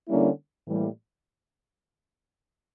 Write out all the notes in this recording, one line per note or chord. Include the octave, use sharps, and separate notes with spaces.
D3 G3 A#3 C#4 E4
A2 E3 G3 A#3